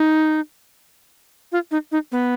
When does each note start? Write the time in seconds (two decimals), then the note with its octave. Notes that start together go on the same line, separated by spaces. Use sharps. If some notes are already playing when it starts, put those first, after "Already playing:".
Already playing: D#4
1.52 F4
1.71 D#4
1.92 D#4
2.12 B3